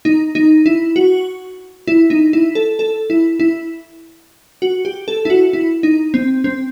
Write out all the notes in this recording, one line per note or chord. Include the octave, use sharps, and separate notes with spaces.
D#4
D#4
E4
F#4
E4
D#4
E4
A4
A4
E4
E4
F#4
G4
A4
E4
F#4
E4
D#4
C4
C4